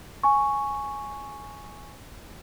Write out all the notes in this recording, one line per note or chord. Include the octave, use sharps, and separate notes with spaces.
G#5 C#6